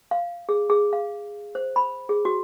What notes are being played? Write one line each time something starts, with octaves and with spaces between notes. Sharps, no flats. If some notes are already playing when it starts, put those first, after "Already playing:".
F5
G#4
G#4
F5
C5
B5
G#4
F#4